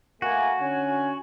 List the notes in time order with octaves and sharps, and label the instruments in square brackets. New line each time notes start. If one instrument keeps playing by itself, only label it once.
[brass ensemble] A3 A#3 G#5 [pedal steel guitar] F#4
[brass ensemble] D3 C#4 G#5